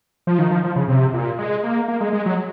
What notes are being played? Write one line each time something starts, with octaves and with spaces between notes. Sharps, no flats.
F3
D#3
F3
F3
C#3
C3
A#2
G#3
A#3
A#3
G#3
G#3
F#3